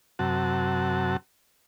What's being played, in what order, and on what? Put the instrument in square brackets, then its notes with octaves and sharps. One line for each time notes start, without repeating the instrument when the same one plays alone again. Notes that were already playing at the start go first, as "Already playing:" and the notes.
[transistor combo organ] F#2 C3 F#4 A5